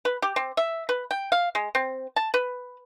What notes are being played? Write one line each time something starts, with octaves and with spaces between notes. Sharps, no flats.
B4
G4
C4
E5
B4
G5
F5
G#3
C4
A5
B4